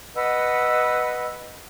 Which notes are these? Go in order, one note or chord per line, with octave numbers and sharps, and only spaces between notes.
B4 D#5 F#5 E6